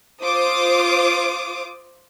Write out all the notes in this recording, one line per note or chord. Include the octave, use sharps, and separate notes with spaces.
F4 C5 D6 D#6